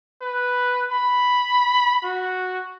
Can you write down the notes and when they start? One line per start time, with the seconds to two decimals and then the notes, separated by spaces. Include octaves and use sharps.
0.21 B4
0.92 B5
2.04 F#4